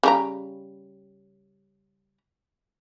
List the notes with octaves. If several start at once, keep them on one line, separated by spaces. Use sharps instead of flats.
C#3 G3 A#5